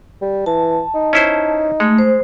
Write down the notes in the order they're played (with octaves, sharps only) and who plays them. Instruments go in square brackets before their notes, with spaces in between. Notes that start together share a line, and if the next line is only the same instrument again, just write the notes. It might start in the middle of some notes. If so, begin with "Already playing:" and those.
[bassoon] G3
[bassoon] E3 [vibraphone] A5
[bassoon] D#4
[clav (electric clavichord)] C#4 E4 C5
[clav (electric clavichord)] G#3 [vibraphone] A3
[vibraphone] C5